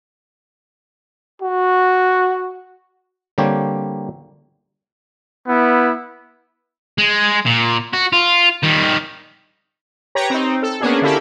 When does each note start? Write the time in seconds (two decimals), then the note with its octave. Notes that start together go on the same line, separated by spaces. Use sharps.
1.42 F#4
3.38 D3 G3 A#3 C4 G4 C#5
5.48 B3 E4
6.98 G#3
7.46 A#2
7.93 F#4
8.13 F4
8.63 D#3 G3
10.15 G4 B4 C#5 A#5
10.30 C4 D#4
10.62 A4
10.80 A#3 B3 C#4 D4 G#4
11.02 D3 A#3 E4 G4 A4